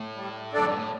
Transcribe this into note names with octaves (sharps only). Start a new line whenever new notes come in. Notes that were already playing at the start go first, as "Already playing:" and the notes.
Already playing: A2
G3
F#2 D4 A4 D5
G2
A2